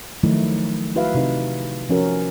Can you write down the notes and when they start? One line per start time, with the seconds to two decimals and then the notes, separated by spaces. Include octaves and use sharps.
0.23 D#3 F3 F#3 A3 D#4 E4
0.96 E4 F#4 B4 E5 F5
1.15 C3 D#4 B4
1.89 F3 C#4 F#4 A#4